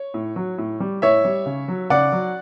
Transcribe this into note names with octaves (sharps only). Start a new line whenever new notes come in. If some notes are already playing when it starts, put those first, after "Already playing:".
Already playing: C#5
A2
F#3
A2
G3
A2 C#5 E5
G3
C#3
F#3
C#3 D5 F#5
F#3